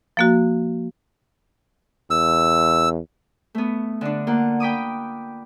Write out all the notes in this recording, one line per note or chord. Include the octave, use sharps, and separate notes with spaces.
F3 A#3 F#4
E2 E6
A3 B3
D3 D4
A#3 F4 F#5
G5 B5 D6 D#6